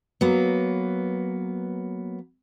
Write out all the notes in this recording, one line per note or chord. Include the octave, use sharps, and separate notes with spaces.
F#3 A#3 B3